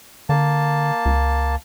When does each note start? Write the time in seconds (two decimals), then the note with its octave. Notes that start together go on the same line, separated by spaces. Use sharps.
0.29 D3 A#3 A5
1.06 C#2